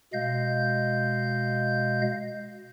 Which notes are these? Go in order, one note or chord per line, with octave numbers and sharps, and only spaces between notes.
B2 G#3 D#5 F5 G6